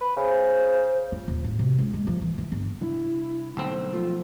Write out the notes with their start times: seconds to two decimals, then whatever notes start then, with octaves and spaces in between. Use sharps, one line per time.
0.01 B4
0.17 C#3 C5
1.12 F4
1.28 D#1
1.44 A1
1.59 C3
1.78 C#2
1.93 G#3
2.07 F3
2.22 E3
2.38 E3
2.52 G1
2.81 C3 G3 D4 E4
3.57 B1 D3 G3 A3 C4
3.93 F3 A3 F4